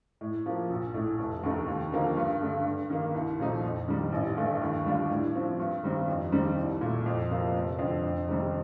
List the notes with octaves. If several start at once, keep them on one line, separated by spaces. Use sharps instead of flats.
A2
F3 A#3
A#1
A2 A3
F1
D#2 D#3 A3
D#2
D3 F3 A#3 D#4
G2
D3 A3 D4
G2
D#3 A#3
C2
A#2 F3 A3 D#4
F2
D#3 G3
A1
G2 D3 A3
D#2
D3 G3 D4 F4
A2
F3 C4
G2
D#3 G3 C4
F2
D#3 G3 C4 D#4
C2
A#2 A3
F2
C3 F3 A#3
F1
F2 D3
F2
C3 D#3 G3